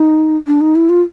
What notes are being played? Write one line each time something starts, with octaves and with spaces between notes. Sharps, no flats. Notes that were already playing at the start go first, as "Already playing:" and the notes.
Already playing: D#4
D4
D#4
E4
F4